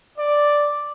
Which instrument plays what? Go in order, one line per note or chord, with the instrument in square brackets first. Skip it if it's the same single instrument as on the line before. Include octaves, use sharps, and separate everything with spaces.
[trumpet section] D5